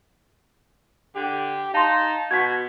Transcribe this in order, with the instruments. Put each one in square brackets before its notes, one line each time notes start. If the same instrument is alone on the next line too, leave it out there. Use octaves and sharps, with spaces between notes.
[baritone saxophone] D3 [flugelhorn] G4
[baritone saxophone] D#4 [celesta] F5 C6 [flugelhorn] A5
[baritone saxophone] B2 [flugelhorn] F#4 [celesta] G#6 B6